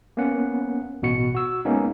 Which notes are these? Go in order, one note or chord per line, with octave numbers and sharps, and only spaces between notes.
A#3 B3 C#4 F#5
A1 B2 F#4 C#7
F#4 E6
G#3 A#3 B3 C#4 D#4